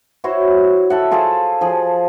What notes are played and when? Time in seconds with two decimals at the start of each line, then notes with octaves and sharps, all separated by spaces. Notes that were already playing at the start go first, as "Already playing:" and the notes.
0.24 E4 F#4 C5 C#5
0.90 A4 E5 F#5
1.11 F4 G#4 A4 C5
1.61 F3 G#4